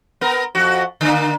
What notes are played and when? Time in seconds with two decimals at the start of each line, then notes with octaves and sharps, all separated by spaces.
0.21 B3 A#4
0.55 F2 F#4
1.01 D3 A#3